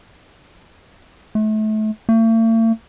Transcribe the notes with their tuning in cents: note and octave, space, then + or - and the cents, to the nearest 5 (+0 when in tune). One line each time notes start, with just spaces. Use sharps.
A3 -30
A3 +45